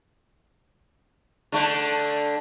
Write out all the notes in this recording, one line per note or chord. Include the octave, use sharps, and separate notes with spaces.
D3 A3 D4